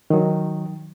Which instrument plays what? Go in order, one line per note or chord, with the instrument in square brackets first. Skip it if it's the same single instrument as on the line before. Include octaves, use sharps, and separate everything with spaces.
[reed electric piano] D#3 F#3